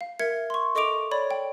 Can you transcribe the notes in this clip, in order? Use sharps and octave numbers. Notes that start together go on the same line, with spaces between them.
F5
A#4 E5 G#6 C#7
C6 C#6
A4 D#5 C#6 D6 D7 F7
C#5 D5 B5
G5